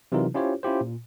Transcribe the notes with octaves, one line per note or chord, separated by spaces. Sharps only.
C3 E3 F#3 D#4 F4 A#4
C#4 E4 F4 G4 C5 C#5
C#4 E4 F4 G4 C5
A#2